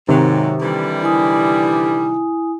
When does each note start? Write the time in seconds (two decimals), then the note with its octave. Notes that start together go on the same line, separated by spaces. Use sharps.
0.09 G#2 C3 D#3 F#3
0.62 D3 E3 G3
1.02 E4 G#5 D#6